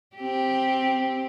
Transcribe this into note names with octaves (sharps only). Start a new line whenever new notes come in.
C4 G4